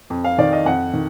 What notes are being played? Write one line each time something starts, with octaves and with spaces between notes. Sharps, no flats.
F2
F5
D#3 D5
D#5
F2 F#5
D#3